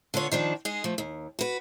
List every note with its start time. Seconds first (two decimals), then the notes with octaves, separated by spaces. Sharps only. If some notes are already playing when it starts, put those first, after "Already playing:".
0.14 D3 B3 F4 C#5
0.32 D#3 F3 D4
0.65 G#3 D#4 G#4
0.84 F3 A3
0.98 D#2
1.39 F#4 B4